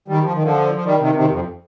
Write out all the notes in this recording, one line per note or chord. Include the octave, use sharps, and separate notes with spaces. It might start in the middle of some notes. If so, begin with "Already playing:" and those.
D#3 G3
F3
D#3
D3 F3
F3
D#3 G3
C3 D#3
C3 D#3
F2